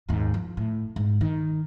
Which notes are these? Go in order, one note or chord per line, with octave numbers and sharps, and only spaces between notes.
D#2 G#2
F3
A2
G#2
D#3